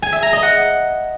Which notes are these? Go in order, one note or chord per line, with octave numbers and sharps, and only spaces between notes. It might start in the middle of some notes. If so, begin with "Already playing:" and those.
G#5
E5
A#5
D#5
F#5